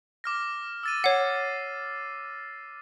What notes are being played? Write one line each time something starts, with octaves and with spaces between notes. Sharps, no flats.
D6 F6 A#6
E6 A6 D#7
C#5 F#5 C7